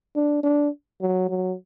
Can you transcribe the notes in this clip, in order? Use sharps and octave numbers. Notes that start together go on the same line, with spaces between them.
D4
D4
F#3
F#3